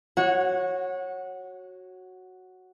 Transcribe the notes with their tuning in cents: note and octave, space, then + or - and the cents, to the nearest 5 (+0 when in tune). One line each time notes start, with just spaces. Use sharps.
F#4 +0 C#5 -15 F#5 -25